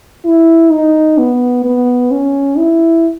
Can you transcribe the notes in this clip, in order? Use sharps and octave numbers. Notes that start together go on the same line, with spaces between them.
E4
D#4
B3
B3
C#4
E4